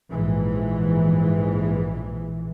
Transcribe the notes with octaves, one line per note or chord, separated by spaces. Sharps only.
A#1 G#2 E3